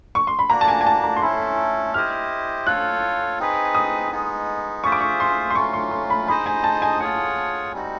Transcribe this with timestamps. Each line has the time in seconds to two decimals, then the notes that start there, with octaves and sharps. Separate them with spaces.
0.15 C#6
0.27 C6
0.39 B5
0.49 A#3 D4 F#4 A#5
0.61 A5
0.68 G#5
0.81 G#5
0.86 A5
1.04 A#5
1.16 C6
1.22 A3 C#4 E4 A4 B5
1.94 E4 G4 C5 D#5 F6
2.67 F4 A4 C#5 F5 F#6
3.40 C4 D#4 G#4 B4
3.75 D#6
4.12 G#3 B3 D#4
4.84 F4 G#4 C5 E5 C#6
4.92 D6
5.01 C#6
5.20 C6
5.50 C6
5.55 F#3 A3 C#4 F4 C#6
5.73 C6
5.91 C6
6.10 B5
6.28 D#4 G#4 C5 D#5 B5
6.46 G#5
6.64 A5
6.82 G#5
7.00 F4 G#4 C#5 F#5
7.73 G3 C4 D#4 F#4